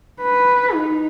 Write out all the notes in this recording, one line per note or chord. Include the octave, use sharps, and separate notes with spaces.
B4
D#4